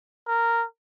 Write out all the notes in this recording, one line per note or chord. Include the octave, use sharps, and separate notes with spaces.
A#4